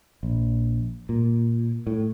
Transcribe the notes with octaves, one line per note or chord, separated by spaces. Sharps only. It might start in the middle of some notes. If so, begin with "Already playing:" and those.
A#1
A#2
A2